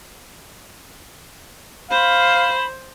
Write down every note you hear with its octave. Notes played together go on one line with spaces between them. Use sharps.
C5 F5 B5